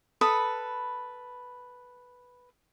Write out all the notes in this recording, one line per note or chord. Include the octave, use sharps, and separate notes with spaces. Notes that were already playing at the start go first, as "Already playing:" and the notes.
A4 B4 B5 D#6